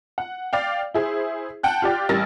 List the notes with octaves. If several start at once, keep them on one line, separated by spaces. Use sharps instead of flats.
F#5
D5 F5 G5
E4 G#4 C5
F#5 G5 A5 F#6
F4 G4 D5 G5
A1 G3 A#4 A6 A#6